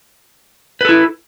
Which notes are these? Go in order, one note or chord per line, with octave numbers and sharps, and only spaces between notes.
E4 A4 B4